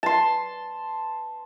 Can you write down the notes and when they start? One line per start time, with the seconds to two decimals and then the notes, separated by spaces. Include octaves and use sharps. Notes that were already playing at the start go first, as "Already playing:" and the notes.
0.03 A5 C6